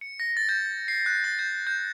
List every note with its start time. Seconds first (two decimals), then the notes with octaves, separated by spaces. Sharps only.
0.01 C#7
0.20 A#6
0.37 A6
0.49 G6
0.88 C7
1.06 F#6
1.24 A6
1.39 G6
1.67 G6